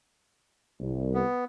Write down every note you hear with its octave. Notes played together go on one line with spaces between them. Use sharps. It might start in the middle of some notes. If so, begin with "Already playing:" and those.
C2
B3